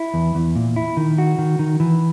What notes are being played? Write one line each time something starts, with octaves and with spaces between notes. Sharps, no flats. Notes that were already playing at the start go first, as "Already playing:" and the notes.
Already playing: E4
E2
E2
A#2
E4
D#3
F#4
D#3
D#3
E3